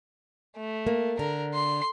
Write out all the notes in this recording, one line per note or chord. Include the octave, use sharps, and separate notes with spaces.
A3
A#3
D3 A#4
C6